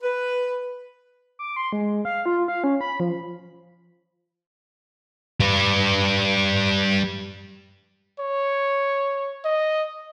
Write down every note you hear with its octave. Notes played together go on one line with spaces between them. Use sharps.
B4
D6
C6
G#3
F5
F4
F5
C#4
B5
F3
G3 B4
C#5
D#5